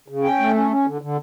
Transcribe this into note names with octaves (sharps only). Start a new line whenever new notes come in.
C#3
C#4 G5
A3
C#4
C#4
D3
D3